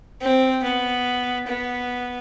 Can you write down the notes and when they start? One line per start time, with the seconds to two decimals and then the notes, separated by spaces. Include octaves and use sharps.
0.22 C4
0.63 B3
1.47 B3